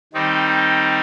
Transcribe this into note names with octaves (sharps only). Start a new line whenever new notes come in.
D#3 G3 C4 D#4